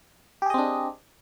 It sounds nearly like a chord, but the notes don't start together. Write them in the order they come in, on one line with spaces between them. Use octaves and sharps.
G4 G#4 D#5 C4 D4